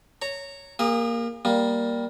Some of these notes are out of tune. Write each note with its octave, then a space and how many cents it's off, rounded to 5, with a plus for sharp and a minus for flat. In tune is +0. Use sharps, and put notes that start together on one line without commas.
C#5 +0 A#5 -15
A#3 +0 G#4 -45 D#6 +0
G3 +0 A#3 +10